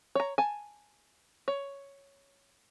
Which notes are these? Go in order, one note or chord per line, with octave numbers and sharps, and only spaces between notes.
C#5 A#5
G#5 A5
C#5